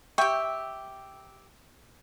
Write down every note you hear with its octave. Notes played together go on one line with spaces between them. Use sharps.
G4 E5 G5 C#6